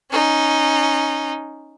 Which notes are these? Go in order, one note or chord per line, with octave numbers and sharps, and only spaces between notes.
C#4 D#4